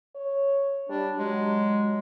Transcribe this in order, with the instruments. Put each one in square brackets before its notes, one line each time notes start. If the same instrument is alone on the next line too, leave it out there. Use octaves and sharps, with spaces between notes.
[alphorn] C#5
[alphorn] G3 [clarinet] D4
[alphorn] F#3 [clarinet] G#3